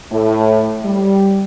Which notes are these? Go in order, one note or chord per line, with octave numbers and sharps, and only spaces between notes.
A2
G3